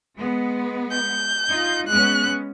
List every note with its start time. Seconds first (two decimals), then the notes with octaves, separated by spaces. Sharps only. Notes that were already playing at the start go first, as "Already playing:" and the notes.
0.17 G#3 B3
0.92 G6
1.48 D#4 F4
1.88 G#3 B3 C#4 F#6